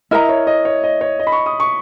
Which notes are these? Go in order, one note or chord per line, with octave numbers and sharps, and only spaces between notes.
E4 A#4 D#5 E5 A#5
C#5
D#5
C#5
D#5
C#5
D#5
B5
C#6
D#6
C#6